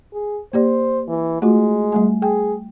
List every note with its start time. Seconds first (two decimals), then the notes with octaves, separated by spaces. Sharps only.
0.13 G#4
0.53 A#3 G4 C5 D5
1.08 E3
1.42 G#3 A3 F4 F#4
1.92 G3 A3 G#5
2.22 G#4 G5